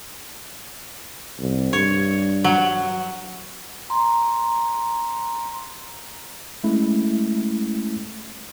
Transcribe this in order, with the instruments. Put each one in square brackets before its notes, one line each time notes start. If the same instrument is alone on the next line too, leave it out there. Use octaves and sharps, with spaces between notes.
[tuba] C2
[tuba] G2 [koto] C#5
[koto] F#3
[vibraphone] A#5 C6
[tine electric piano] G#3 A3 C#4 E4